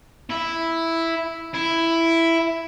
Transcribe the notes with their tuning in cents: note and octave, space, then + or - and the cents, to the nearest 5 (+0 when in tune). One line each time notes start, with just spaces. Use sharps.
E4 +0
E4 +5